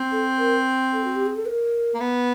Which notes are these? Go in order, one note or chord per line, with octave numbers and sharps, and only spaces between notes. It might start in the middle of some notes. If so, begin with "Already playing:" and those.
Already playing: C4
A4
A#4
A4
F#4
G4
G#4
A4
B4
A#4
A#3
B3